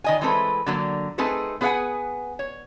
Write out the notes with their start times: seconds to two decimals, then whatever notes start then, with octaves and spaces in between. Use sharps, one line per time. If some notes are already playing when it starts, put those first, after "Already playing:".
0.04 D#3 D#5 G#5
0.21 E3 G#3 A3 C4 A4 B4
0.66 D3 F#3 A#3
1.18 A3 C4 D#4 G#4 A4 B4
1.61 B3 G#4 B4 F5 F#5 G#5
2.39 C#5